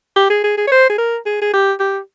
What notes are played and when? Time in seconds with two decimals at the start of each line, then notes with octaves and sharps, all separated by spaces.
0.16 G4
0.30 G#4
0.44 G#4
0.58 G#4
0.68 C#5
0.72 C5
0.90 G#4
0.98 A#4
1.26 G#4
1.42 G#4
1.54 G4
1.80 G4